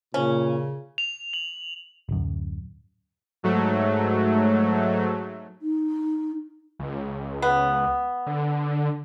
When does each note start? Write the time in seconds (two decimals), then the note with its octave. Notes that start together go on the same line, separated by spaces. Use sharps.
0.14 A#2 C#3 C#4
0.98 F7
1.33 F#7
2.09 D1 F#2
3.43 G#2 F#3 A3
5.62 D#4
6.79 C#2
7.42 B3
8.27 D3